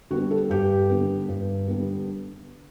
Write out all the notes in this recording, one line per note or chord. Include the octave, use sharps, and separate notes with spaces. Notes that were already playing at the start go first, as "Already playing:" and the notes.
D3 G3 B3 F#4
A4
G2 G4
D3 G3 B3
G2
D3 G3 B3